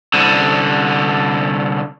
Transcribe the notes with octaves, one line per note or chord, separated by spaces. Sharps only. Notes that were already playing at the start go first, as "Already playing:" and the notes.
C2 D3